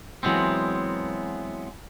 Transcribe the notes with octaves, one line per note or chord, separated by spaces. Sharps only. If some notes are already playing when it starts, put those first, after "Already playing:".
E3 F#3 G#3 B3 C4